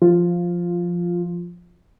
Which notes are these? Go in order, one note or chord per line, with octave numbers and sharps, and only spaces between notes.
F3 F4